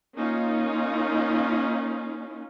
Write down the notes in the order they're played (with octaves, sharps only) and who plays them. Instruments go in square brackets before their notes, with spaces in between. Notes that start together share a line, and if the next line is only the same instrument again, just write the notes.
[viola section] A#3 C#4 D#4 F4